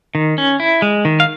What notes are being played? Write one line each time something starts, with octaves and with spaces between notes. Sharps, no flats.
D#3
C#4
E4
G#3
D#3
F5